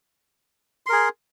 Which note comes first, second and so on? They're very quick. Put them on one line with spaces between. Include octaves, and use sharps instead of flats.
C6 A#4 G#4